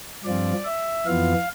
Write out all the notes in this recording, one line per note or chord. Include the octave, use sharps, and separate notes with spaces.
G2 F3 C4 F4 D5
E5
F2 E3 B3 F4 F5